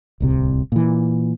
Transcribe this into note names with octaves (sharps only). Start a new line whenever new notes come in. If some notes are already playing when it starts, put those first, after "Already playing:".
D1 C2 C3
A#2 E3